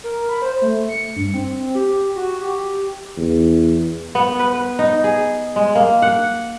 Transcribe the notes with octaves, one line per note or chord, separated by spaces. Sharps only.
A#4
B5
C5
A3
C#7
G2
C4
G4
F#4
G4
E2
B3
B4
B4
D#4
G#4
G#3
A#3
F#5